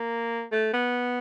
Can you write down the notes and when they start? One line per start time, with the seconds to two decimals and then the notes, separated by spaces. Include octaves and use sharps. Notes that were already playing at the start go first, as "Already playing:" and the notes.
Already playing: A#3
0.52 A3
0.73 B3